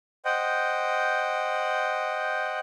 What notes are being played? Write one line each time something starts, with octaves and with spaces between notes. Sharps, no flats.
C5 D#5 F#5 G5